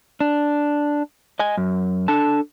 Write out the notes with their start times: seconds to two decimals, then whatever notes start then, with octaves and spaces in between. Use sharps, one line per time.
0.20 D4
1.39 D#5 G#5
1.57 F#2
2.08 D4 A4 A5